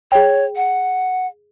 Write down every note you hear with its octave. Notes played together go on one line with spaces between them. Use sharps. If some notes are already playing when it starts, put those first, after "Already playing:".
G#4 C#5 G5
F#5